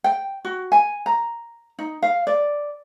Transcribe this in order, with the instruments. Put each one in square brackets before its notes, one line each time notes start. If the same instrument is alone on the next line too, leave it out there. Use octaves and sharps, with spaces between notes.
[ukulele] G5
F#4
G#5
A#5
D#4
F5
D5